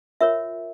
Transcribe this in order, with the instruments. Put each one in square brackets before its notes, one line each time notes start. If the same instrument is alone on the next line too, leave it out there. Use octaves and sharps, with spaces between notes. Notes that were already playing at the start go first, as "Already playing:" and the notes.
[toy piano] F4 A#4 C#5 E5